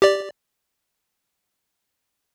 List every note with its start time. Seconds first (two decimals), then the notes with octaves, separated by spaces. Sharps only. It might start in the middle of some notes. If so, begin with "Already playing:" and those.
0.02 G4 D5